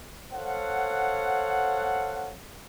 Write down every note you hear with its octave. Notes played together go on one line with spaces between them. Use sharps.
A4 C5 C#5 F5 F#5